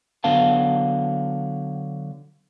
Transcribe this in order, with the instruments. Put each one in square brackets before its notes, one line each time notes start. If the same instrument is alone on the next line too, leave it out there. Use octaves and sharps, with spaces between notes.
[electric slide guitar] D3 F#3 B3 F5 A5